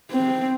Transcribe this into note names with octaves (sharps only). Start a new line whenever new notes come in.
C4